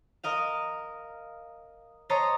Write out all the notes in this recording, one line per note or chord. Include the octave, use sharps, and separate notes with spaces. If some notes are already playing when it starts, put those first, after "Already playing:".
A#4 D#5 F5
C5 C#5 D#5 A5 A#5